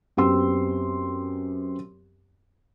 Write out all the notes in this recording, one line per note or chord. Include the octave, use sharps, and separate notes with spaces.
F#2 B3 C4 G4 C6 E6